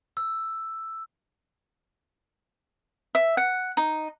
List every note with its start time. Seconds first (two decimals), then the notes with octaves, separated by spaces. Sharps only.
0.17 E6
3.15 E5
3.37 F#5
3.77 D#4